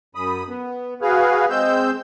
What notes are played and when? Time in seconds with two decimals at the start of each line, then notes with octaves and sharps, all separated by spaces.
0.15 F#2 B5 D#6
0.48 B3
1.02 F#4 G#4 B4 F5
1.50 G#3 C4 E6 G6